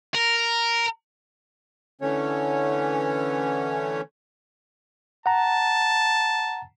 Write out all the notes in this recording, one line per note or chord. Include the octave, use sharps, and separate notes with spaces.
A#4
D3 E3 A3 C#4 C#5
F#5 A5 A#5